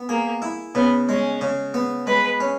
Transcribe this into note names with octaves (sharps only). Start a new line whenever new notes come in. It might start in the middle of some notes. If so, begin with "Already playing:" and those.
Already playing: B3
A#3 G#4
E4
C#3 B3
G#3 C#4
C#3
B3
G#3 B4
C#4